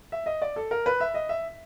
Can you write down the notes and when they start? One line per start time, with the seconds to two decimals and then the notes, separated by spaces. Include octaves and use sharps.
0.12 E5
0.26 D#5
0.42 D5
0.56 A4
0.71 A#4
0.86 B4
1.00 E5
1.14 D#5
1.29 E5